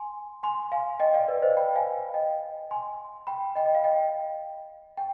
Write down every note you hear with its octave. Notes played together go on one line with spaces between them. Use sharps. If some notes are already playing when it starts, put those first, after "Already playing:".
Already playing: G#5 C6
G#5 C6
F5 G#5
D#5 G5
D5 F5
B4 D5
C5 D#5
G5 B5
F5 G#5
D#5 G5
G#5 C6
G5 B5
D#5 G5
D#5
F5
D#5 G5
G5